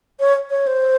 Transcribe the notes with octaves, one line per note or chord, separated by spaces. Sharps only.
C#5
C#5
C5